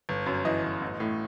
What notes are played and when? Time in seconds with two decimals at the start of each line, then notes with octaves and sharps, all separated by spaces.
0.09 G1
0.26 F#2
0.45 E3 D#5
0.64 G1
0.81 A1
1.00 A2